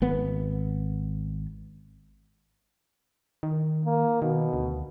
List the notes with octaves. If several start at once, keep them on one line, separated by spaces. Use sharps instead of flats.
G#1 B3
D#3
A#3
B2 D#3
D2